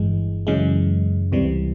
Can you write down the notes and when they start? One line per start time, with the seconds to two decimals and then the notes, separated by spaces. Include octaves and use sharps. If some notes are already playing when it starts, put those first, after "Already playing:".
Already playing: G1 G2 E3 G#3
0.47 F#2 C#3 E3 G#3
1.32 C#2 C3 E3 G3